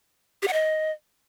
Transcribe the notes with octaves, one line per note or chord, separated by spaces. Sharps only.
G4
F#5
D#5